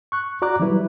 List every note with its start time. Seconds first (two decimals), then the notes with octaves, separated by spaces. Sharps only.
0.12 C#6 F#6
0.42 F#4 D5 A#5 D6 F#6
0.60 E3 F#3 G3 E4 B4